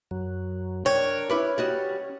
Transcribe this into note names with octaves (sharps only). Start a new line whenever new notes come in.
F#2 F#3
D4 A#4 C#5 G5
C#4 E4 B4 D5
G3 F#4 D#5